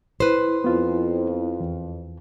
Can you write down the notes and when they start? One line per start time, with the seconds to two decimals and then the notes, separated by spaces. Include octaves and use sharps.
0.20 E4 B4 C5
0.64 F2 B3 F4
1.60 E2